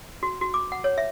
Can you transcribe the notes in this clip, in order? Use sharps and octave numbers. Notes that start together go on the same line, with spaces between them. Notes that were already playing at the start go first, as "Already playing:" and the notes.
F#4
F#4
D6
F#5
C#5
E5